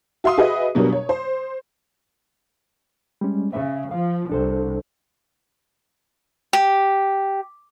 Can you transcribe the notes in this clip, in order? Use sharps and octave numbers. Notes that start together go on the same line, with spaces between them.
F#4 E5 F5 C6 D#6
F#4 G#4 B4 D#5 E5
B2 F#3 G3 D4 A#4
C#5
C5
G3 G#3 C#4
C#3 E5
F3 F5
C2 D4 A4 C5
G4